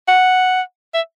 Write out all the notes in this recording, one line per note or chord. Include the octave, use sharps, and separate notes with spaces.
F#5
E5